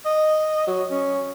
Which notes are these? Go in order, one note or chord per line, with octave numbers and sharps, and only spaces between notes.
D#5
F#3
C#4